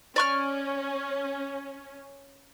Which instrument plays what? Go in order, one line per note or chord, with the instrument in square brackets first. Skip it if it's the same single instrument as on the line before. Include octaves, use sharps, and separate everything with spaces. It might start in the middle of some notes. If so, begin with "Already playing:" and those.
[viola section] C#4 [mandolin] D5 C#6 F6